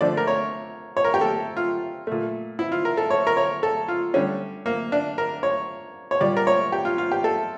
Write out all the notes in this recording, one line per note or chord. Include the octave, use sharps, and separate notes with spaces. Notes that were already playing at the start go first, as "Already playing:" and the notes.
D3 F3 A3 D5
A#4
C#5
C#5
A#4
G4
A4
F4
A#2 A3
E4
F4
A#4
A4
C#5
A#4
C#5
A4
F4
D3 G3 C#4
A#3
D4
A#4
C#5
C#5
A#2 G3 D5
A#4
C#5
G4
F4
F4
G4
A4